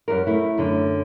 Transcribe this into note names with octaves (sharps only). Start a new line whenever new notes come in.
F#2 G3 A#4
A3 E4
F#2 D3